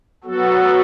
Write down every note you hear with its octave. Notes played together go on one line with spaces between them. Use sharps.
F#3 B3 F#4 A4